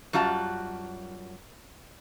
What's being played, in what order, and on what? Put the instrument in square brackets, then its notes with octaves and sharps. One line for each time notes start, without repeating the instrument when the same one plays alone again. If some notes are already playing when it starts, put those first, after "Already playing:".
[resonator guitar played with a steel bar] F#2 G3 F4 F#4 A5